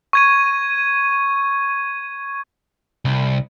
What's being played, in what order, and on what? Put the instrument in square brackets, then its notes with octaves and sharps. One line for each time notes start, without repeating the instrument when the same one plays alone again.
[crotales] C#6 G#6 D#7
[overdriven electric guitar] C2